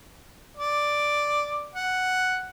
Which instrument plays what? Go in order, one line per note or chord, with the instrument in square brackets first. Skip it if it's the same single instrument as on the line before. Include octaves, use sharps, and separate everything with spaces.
[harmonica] D5
F#5